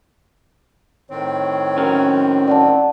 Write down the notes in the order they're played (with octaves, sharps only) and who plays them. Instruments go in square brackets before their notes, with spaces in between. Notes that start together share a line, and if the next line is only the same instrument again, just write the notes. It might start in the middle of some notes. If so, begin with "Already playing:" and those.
[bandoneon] A2 D#3 C4 [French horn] C#5
[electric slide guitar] C#4 F#4 A#4
[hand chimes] D5 F#5 A5